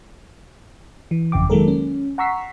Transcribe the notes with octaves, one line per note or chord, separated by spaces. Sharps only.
E3
G1 F2 C#3 G5 D6
D#3 F#3 G#3 A#3 A4 A#4
C#4
F#5 A#5 C#6 E6 B6 C7